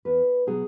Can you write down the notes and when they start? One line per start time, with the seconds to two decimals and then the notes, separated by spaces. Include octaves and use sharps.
0.05 E2 B4
0.47 B2 F#3 G#4